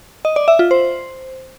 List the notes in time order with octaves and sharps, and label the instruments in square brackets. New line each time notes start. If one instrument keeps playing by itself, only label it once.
[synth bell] D#5
D5
E5
F4
C5